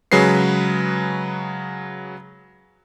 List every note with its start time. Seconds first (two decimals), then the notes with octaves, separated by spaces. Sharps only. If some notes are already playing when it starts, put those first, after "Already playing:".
0.12 C#3 F#3 G#3 B4 C7